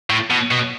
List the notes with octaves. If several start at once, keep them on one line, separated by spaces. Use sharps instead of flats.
A2
B2
B2